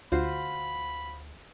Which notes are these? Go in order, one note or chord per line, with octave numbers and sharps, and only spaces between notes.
D2 F4 F#4 C5 B5